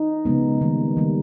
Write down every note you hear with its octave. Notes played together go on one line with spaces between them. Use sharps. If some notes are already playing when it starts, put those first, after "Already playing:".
Already playing: D#4
C#3 F3 G#3 B3
D#3 G3 A#3
D#3 G3 A#3